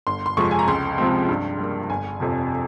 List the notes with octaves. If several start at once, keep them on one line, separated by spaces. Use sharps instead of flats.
G1 C6
C6
F2 C3 F3 G#3 C#6
G#5
A#5
C#2 C6
C3 F3 G#3 C4
G2
G3 A#3
G1 G#5
F2 C3 F3